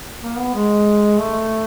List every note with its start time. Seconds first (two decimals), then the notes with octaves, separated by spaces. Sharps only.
0.21 A#3
0.38 B3
0.54 G#3
1.18 A3